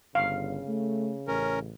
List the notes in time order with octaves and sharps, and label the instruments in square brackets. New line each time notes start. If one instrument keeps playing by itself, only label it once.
[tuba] G1 [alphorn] C#3 [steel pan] F5
[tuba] A3
[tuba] A1 [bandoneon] C#4 A#4